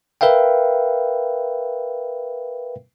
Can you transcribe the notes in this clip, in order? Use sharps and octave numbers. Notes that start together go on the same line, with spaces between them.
A#4 B4 E5 F5 G5